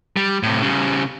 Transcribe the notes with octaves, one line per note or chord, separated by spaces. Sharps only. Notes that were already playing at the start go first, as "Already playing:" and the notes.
G3
A2 C3
C#3 G3